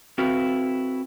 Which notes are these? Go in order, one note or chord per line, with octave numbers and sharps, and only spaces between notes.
C4 E4 F#4 A4 B4 F5